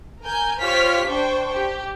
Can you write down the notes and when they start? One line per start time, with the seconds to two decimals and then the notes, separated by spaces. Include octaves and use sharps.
0.23 A#4 G#5 G6
0.61 F4 G4 C5 C#5 F6 B6
1.07 D4 C5 G5 C#6
1.54 G4